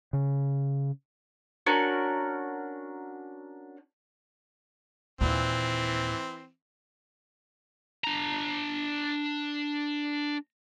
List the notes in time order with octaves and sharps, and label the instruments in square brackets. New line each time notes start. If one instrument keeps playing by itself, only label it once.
[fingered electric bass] C#3
[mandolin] C#4 D4 F#4 A#4
[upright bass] D#2 A#2 [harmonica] E3 C4
[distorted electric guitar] D4 A#5